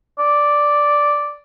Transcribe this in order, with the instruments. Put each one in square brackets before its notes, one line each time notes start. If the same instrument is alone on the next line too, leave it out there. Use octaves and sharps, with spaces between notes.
[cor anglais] D5